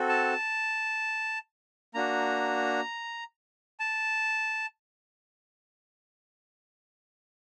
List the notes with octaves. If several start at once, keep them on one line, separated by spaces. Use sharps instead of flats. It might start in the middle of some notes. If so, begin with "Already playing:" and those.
Already playing: C4 F#4 A4
A5
A#3 D4 F#4 A#5
A5